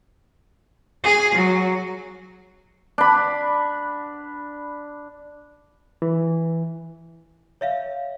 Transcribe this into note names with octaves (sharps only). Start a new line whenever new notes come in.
G#4
F#3
D4 B5
E3
C#5 E5 F5